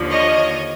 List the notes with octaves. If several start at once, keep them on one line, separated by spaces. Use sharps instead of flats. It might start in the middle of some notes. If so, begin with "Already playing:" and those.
Already playing: D#2 D3 F3
C#5 D#5